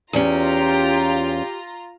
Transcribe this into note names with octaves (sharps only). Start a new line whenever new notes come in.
E2 C#4 F4 G4 A#5